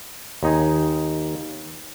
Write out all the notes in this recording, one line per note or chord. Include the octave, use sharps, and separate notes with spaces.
D#2 D#4 G#5